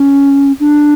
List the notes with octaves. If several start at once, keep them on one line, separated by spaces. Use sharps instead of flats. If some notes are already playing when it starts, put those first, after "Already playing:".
Already playing: C#4
D4